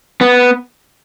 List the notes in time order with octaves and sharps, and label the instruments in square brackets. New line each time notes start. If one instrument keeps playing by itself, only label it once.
[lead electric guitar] B3